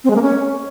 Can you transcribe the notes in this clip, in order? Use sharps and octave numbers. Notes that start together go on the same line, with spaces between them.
C4
G#3
A#3
C#4